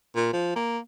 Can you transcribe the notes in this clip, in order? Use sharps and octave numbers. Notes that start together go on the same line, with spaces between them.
A#2
F3
A#3